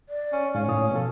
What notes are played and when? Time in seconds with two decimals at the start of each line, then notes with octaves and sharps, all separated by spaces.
0.09 D5
0.33 C#4
0.55 G#2 C#4 F5
0.68 A2 C#5 D#6
0.91 B2 F3 A4